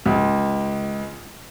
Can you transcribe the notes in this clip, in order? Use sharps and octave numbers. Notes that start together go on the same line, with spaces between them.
C#2